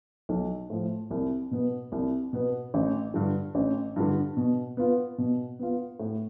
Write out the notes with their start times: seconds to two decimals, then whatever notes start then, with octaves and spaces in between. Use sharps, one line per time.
0.29 B1
0.70 A2 F3
1.11 C2
1.51 B2 B3
1.92 C2
2.33 B2 B3
2.74 A1
3.14 G2 D3
3.55 A1
3.96 G2 D3
4.37 B2
4.77 B3 F4
5.18 B2
5.59 B3 F4
5.99 A2